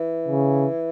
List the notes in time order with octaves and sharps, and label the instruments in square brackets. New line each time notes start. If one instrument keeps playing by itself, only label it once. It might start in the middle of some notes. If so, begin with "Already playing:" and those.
Already playing: [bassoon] E3
[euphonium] C#3